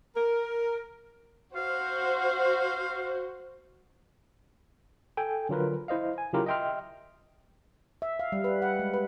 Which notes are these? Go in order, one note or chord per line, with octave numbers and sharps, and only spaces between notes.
A#4
F#4 C5 F5
A4 G5 G#5
D3 F#3 F4 A#4 B4
E4 C5 D#5 F5
G#5
C#3 F#3 E4 F4 G4 A#4
D#5 E5 G5 C6 F6
E5
F5
G3
B4
F#5
G#3
B4